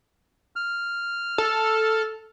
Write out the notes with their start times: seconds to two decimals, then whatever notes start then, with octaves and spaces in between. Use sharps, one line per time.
0.56 F6
1.38 A4